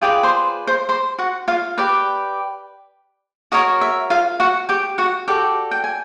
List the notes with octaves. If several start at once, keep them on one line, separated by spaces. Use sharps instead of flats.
F4 G4 G#4 B4 D5 G5
C5 C6
C5 C6
C5 C6
F#4 F#5
F4 F5
G4 B4 D5
F#4 A#4 C#5 D#5
E5
F4 F5
F#4 F#5
G4 G5
F#4 F#5
F#4 G4 A4 D5 G5
G5
G#5